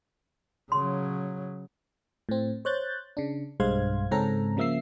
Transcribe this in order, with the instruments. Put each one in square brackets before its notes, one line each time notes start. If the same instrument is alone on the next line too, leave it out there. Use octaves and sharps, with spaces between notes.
[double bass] C#3 F#3 [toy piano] C6
[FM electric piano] A2 C4
C5 C#5 F#6 G6 A6
C#3 D4
B1 G2 G#3 C5 F5 G#6
G#2 C#3 C4 C#4 A4 A#5
C#3 F3 A#3 E5 E6 C7